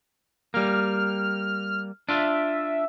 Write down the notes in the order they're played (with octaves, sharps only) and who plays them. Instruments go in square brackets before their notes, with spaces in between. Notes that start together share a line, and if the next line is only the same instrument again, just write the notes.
[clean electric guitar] G3 A#3 [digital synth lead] F6
[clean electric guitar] D4 F4 [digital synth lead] E5